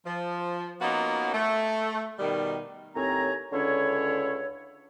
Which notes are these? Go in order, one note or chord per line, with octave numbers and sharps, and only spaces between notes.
F3
A#3 B3 C#4 D#4 F4 F#4
A3
B2 D#3 G3
D#2 A2 C4 C#5 G#5 A#5
C#2 D3 C#4 E4 C#5